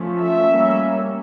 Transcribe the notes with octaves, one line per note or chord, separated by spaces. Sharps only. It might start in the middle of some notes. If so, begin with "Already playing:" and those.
Already playing: F3 A3 C#4
E5
G3 A#3 C#4